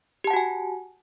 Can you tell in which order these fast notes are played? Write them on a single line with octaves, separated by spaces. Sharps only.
G4 A5 F#5 F#4 G#5